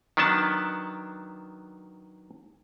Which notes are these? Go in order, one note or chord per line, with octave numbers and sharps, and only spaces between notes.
D#3 F#3 B3 D4 A5